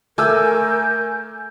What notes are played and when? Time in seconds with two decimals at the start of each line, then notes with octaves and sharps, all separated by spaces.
0.18 A3 A#4 G#5 D6 E6 G6